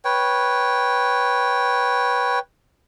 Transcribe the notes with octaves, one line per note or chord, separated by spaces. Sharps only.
B4 C#5 G5